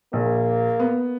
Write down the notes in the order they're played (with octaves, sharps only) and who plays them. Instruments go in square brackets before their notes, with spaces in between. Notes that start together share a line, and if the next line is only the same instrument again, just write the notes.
[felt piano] A#1 [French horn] A#3
[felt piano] B3